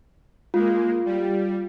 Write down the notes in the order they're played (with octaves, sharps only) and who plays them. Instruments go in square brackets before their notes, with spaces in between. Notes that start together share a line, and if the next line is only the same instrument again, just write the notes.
[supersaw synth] G#3 A#3 [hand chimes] F4
[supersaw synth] G3